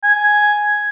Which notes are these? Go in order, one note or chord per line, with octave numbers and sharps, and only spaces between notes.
G#5